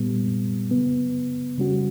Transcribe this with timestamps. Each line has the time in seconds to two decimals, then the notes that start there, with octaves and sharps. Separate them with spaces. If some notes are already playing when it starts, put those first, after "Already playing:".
Already playing: A#2 G3 B3
0.71 C#3 F#3 B3
1.58 C#3 G3 C#4 F#4